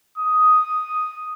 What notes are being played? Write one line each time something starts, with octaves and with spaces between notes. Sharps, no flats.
D#6